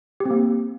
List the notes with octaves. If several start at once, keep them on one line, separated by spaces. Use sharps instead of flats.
G4
C4
A#3